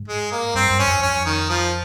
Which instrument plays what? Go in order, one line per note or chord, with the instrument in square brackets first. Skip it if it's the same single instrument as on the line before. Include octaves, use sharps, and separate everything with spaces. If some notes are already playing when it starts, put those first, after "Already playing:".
Already playing: [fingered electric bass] G#2
[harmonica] G#3
A#3
[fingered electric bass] G2 [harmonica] C4
[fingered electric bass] G2
[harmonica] C#4
[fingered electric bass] F2
[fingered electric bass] F2 [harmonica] C#4
[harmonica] D#3
F3